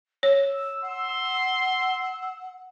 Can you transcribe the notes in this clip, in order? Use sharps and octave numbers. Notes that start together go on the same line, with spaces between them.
C#5 E6
F#5 C6